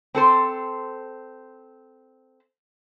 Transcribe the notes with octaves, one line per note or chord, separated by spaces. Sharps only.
C4 A4 C5